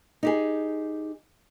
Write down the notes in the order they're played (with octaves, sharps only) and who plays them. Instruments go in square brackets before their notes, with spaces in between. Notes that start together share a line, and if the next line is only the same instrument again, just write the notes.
[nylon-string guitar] D#4 G4 G#4